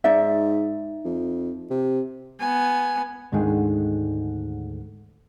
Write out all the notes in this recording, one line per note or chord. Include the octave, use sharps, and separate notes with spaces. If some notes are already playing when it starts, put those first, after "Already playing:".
G#2 D#4 D5 E5
F2
C3
B3 G#5
D2 G#2 D3 D#3 G#3